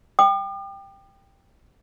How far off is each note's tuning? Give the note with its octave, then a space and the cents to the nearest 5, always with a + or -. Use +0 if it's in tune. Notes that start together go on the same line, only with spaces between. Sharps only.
G5 +5 D6 +45